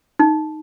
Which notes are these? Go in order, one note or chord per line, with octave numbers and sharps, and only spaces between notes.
D#4